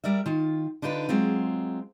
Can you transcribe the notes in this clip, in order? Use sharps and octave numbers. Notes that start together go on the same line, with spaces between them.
G3 A#4 D5 E5
D#3 F4
D3 D4 D#4 F4 B4
F#3 G#3 C4 F4